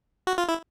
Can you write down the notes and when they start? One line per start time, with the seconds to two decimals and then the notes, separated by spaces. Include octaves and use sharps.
0.27 F#4
0.38 F4
0.49 E4